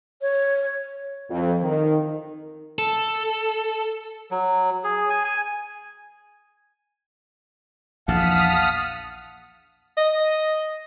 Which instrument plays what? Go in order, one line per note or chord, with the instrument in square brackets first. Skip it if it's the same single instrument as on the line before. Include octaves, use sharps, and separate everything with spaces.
[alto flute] C#5
[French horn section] F2
D#3
[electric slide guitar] A4
[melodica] F#3
G#4
G#5
G#5
[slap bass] A#1 E2 [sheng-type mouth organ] F5 F#5 A5 [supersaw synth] D#6 F6 B6
[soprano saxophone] D#5